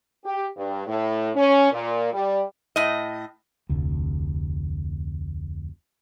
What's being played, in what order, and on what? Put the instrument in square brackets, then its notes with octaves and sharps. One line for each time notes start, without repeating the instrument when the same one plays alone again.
[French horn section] G4
G2
A2
C#4
A#2
G3
[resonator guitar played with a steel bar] A2 D#5
[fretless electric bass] F1 D2